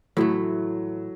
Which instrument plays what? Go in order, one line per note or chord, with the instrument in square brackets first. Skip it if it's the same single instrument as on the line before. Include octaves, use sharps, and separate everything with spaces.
[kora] A2 E3 A3 [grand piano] F#3